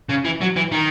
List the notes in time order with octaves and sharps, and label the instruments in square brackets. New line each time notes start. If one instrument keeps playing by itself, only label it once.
[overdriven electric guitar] C#3
E3
F#3
E3
D#3